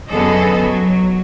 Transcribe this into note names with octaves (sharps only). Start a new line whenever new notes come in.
F#2 D3 B3 G#4 A4 D#5
F#3